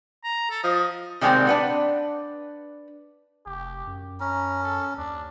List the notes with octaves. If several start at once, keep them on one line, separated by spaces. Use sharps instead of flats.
A#5
A4
F3 D#5
C3 D#3 G3 G#3 A#3 C4
D4 B4 F#5
F1 G4
F#2
C#4 A#5
A4
D#2 D4